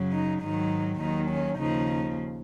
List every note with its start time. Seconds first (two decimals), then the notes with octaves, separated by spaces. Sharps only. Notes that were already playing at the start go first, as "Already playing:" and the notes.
Already playing: F#2 C#3 F#3
0.13 D#4
0.43 G#2 D#3 F#3 D#4
1.00 D#2 D#3 F#3 D#4
1.30 C#4
1.58 D#2 C#3 F3 D#4